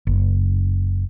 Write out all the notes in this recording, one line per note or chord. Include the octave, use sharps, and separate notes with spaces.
F#1